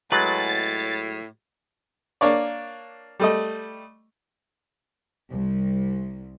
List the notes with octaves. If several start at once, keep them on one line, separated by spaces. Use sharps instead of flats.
A2 F#3 G#3 B4 A6
A#3 D4 C#5 D5
G3 A3 D#5
C2